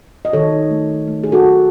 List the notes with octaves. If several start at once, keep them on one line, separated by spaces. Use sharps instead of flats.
D#5
D#3 A4 C#5
A3
A3
G#4
F#4 A4
D#3